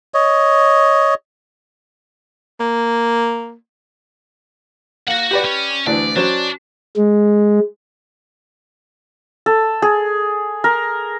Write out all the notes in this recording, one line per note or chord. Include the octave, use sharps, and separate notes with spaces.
C#5 D#5
A#3
A#3 F#4 F#5
G4 B4 D5
C#4
D2 E3 D4 D5
F#3 C#4 D4 C5
G#3
A4
G#4
A#4